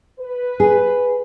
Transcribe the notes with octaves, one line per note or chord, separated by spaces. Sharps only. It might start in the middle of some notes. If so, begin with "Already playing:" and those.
B4
G#4